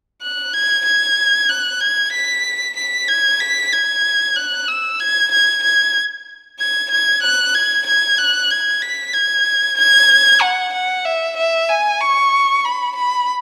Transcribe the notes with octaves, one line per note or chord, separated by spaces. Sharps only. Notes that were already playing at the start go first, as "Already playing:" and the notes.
F#6
G#6
G#6
F#6
G#6
B6
B6
G#6
B6
G#6
F#6
E6
G#6
G#6
G#6
G#6
G#6
F#6
G#6
G#6
F#6
G#6
B6
G#6
G#6
F#5
F#5
E5
E5
G#5
C#6
B5
B5